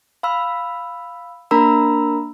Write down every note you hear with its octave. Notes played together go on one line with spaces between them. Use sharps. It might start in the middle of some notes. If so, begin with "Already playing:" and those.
F5 B5 E6
A#3 D4 A#4 A#5 B5 E6